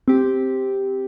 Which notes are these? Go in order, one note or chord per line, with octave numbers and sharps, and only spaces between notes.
C4 G4